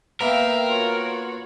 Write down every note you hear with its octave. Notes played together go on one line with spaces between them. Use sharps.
A#3 B3 A#4 E5 F5 G5
F4 F#4 C#5